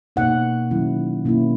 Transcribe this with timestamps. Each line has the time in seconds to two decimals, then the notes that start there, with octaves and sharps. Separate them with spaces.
0.16 B2 A#3 D#4 F#5
0.71 D#3 F#3 C#4 E4
1.25 B2 A#3 C#4 E4